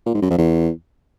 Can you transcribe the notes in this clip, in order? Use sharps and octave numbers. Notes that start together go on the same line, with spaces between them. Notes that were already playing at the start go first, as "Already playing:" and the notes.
A#2
G#2
F#2
F2
E2